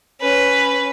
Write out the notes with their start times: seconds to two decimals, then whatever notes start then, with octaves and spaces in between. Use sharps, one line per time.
0.21 C#4 B4